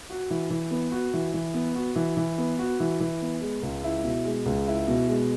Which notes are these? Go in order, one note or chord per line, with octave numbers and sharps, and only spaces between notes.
F#4
E3
E3
B3
F#4
E3
E3
B3
F#4
E3
E3
B3
F#4
E3
E3
B3
G#3
C#2
E4
B2
G#3
C#2
E4
B2
G#3